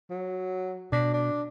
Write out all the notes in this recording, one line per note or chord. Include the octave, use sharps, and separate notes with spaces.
F#3
B2 D4
D4